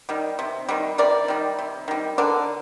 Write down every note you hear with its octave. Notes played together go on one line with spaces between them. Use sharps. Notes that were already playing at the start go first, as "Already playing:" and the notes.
D#3 G3
C3
D#3 G3
C3 A#4 D5
D#3 G3
C3
D#3 G3
D3 A#4 D5